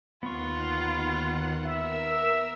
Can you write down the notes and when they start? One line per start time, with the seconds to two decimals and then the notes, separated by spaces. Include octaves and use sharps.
0.23 D#2 D#3 B3 F4 F#5 C#6
1.65 A#4 E5 E6